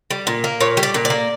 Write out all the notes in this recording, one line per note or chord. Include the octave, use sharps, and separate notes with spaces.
G3
A#2
A#3
A#2 C#5
G3
D5
A#2
D5
A#3